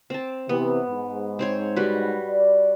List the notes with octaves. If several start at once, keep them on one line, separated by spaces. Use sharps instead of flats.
C4 A5
C3 E3 B3
G#2
C4 C5 C#5
G3 F#4 B4
D5